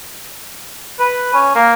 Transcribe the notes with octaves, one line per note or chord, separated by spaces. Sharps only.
B4
C#4
A#3